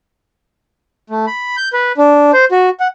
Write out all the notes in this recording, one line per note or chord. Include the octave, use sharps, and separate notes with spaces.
A3
B5
G6
B4
D4
C5
F#4
F#5